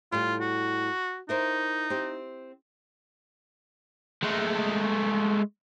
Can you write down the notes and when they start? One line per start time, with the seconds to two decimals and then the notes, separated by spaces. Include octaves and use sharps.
0.12 A2 G3 F4
0.41 F#4
1.29 D#4 E4 A#4 C5
1.90 C4 G4
4.24 G#3 A3